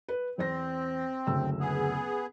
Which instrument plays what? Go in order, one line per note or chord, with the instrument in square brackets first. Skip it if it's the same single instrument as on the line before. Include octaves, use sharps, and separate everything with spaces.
[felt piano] B4
[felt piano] E2 C5 A#6 [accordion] C4
[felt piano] F#1 D2 E6
[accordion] B3 G#4